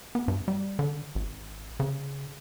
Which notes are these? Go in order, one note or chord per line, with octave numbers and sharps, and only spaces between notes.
B3
G2
G3
D3
G#1
C#3